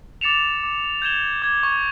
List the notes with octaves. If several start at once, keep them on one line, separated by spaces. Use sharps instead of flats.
D6 A6 C#7 E7 F7
D6
G6 G#6 E7 G7
D6 G#6
C#6